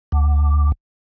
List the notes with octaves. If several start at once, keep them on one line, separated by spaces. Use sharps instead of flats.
D2